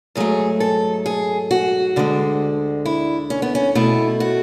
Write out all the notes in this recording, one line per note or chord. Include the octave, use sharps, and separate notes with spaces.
G#2 F#3 A3 G#4
A4
G#4
F#4
D2 D3 G#3
E4
C#4
B3
C#4
B2 A3 E4
F#4